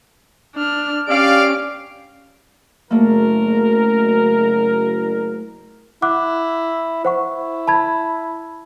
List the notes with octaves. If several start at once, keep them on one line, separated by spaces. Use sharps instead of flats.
D4 F6
C#4 G4 D5 F5 D7
F#1 A3 A#3 A#4
E4 F#5 D6 F#6
E4 C5 F#5 C#6
A5 B5 G#6